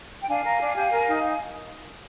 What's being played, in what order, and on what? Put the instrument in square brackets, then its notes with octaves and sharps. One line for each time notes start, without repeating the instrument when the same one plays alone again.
[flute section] G5
D4 F5 G#5
A#4
D4
G4
A#4
D#4